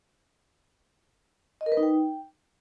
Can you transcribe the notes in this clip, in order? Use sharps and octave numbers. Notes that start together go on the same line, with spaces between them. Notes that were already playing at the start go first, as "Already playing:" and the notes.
D#5
A#4
B4
D#4
G5